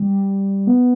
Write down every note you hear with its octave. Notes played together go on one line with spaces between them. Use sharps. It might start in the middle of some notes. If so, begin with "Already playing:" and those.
Already playing: G3
B3